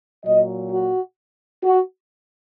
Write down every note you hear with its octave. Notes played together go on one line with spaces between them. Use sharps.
A#2 F#3 D#5
F#4
F#4